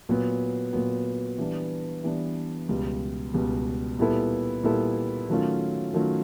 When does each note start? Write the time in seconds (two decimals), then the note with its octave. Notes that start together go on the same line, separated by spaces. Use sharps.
0.09 A#2 F#3 B3
0.73 A#2 F#3 B3
1.38 E3 G3 B3 D4
2.04 E3 G3 B3 D4
2.69 C#2 B2 G3
3.34 C#2 B2 G3
3.99 A#2 G3 B3 E4 A4
4.64 A#2 G3 B3 E4 A4
5.29 D#3 F#3 A3 C#4 F4
5.93 D#3 F#3 A3 C#4 F4